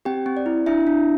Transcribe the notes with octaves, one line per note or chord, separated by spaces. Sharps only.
C4 G4 G5
C4
D5
E4
D4 E4 E5
D4